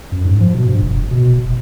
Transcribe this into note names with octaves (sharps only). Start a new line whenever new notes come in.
F#2
G#2
F3
B2
G2
F1
B2
F1